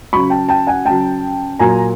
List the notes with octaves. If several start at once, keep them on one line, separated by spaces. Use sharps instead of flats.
C#3 F#3 B5 C#6
G5 A5
G5 A5
F#5 G#5
C#3 F#3 G5 A5
A#2 F#3 G#5 A#5